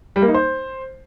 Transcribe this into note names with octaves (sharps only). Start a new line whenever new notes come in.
G3
A#3
D#4
C5